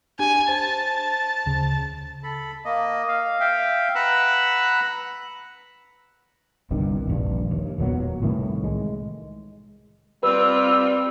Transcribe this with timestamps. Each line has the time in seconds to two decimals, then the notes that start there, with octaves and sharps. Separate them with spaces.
0.19 D4 G4 G#5
0.49 C5 A5
1.46 D2 C#3
2.23 A4 B5
2.65 A#3 D#5
3.08 F5
3.40 E5 F5 G5
3.95 B4 F#5 A#5 B5 E6 F#6
6.71 G1 C2 G2 D#3
7.07 D#1 A#1 G2
7.51 D#2
7.78 E1 A#2 F#3 B3
8.22 C2 A2 D#3 E3
8.64 G#3
10.23 G3 C4 F4 B4 E6